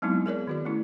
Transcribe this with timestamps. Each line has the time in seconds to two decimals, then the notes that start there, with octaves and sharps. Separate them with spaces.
0.02 F#3 G#3 B3 C4 D#4 E4
0.26 G#4 A#4 C#5 D5
0.47 D#3 F#4 D5
0.65 A3 C#4 E4